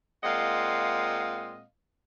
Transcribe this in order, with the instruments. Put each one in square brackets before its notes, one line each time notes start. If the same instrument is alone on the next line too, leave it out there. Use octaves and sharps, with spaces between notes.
[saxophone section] A#2 G#3 C4 D#5 F5 F#5